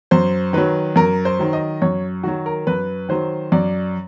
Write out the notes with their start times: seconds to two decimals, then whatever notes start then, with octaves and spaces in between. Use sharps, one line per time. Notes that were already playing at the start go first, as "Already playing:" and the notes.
0.11 F#2 C5
0.53 D#3 F#3 B4
0.96 F#2 A#4
1.25 C5
1.39 D#3 F#3
1.53 D#5
1.82 F#2 C#5
2.23 D#3 F#3 F#4
2.46 A#4
2.67 F#2 B4
3.09 D#3 F#3 C5
3.52 F#2 D5